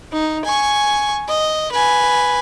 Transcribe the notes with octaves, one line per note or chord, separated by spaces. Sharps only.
D#4
G#5 C#6
D#5
B4 G#5